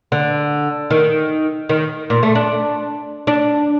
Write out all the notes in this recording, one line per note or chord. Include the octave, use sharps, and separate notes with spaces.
D3
D#3
D#3
A#2
A3
D4
D4